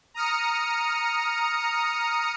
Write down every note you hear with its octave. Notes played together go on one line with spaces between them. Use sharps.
A#5 D#6 F6 C#7